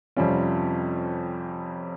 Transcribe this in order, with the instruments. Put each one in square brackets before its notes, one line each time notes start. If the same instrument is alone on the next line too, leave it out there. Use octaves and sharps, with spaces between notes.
[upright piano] F2 C3 G3 C#4 F4